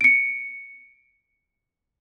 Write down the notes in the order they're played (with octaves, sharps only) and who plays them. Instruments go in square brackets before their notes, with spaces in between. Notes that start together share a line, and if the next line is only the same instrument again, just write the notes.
[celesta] C#7 D7